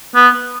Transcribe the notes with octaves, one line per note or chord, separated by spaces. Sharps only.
B3